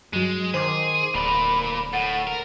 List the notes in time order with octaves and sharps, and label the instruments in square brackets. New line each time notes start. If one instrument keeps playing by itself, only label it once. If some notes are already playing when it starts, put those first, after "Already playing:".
[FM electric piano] G2 F#3 [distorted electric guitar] G#3
[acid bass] D#3 [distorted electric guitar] G#4 [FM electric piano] C5 C6 D6
[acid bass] D1 [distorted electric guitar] A#3 D5 [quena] B5
[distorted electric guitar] A2 [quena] F#5 [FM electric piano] A6
[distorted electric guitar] A#4